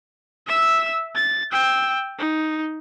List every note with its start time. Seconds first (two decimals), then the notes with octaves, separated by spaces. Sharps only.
0.47 E5 E6
1.16 A6
1.52 G5 E6
2.19 D#4